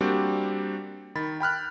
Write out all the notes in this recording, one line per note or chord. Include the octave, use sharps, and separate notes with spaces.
G3 A#3 C4 D4 F#4 G4
D#3 B5 A6
G5 B5 F6 F#6